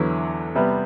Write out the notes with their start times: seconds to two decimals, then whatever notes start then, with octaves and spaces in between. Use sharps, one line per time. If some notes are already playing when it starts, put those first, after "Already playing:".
Already playing: E2 D3 F#3 B3 E4
0.55 C3 G3 B3